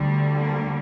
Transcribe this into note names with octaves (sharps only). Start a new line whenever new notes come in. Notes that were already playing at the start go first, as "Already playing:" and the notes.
Already playing: D2 D3 G3
A#3